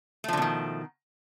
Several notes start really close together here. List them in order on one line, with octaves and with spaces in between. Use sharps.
A3 F3 D3 B2 D#3